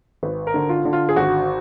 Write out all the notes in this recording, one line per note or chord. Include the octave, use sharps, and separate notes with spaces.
G#1 B4
A#4
D3
F4
D3
F4
G#4
G#1 F#4